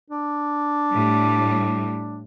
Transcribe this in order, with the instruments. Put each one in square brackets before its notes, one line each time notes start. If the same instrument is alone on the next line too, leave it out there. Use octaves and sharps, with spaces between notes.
[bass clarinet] D4
[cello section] A2 G3